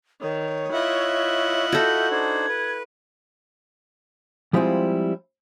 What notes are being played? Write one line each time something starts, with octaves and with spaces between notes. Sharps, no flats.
D#3 C#5
E4 F4 D#5 E5 F#5
F#4 A4 G6
D4 D#4 C5 G#6
B4
F3 G3 G#3 C4 E4 F4